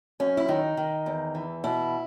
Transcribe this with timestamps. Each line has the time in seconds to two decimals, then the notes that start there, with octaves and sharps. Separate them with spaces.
0.20 F#2 C#4
0.37 E4
0.48 D#3 D#4
0.77 D#3
1.06 E2
1.35 E3
1.64 B2 E4